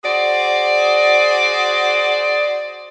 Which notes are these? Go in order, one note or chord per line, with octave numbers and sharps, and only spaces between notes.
F#4 G#4 C5 D5